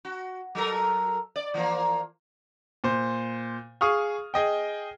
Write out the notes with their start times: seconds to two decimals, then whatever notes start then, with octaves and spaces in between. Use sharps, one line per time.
0.05 F#4
0.55 F#3 A4 A#4
1.36 D5
1.54 E3 F3 A#3
2.84 A#2 C5
3.81 G#4 F5 C#6 D#6 F6
4.34 G#4 D#5 G5